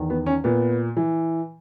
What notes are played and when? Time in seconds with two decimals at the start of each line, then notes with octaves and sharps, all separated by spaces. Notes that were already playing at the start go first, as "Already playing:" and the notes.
Already playing: E2 D#3
0.10 B3
0.26 C#4
0.44 A#2 B3
0.97 E3